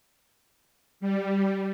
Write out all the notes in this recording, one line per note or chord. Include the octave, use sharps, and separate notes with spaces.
G3